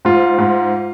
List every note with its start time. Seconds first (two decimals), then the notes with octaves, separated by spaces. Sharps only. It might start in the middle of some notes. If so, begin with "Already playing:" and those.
0.05 G#2 F4
0.38 G#2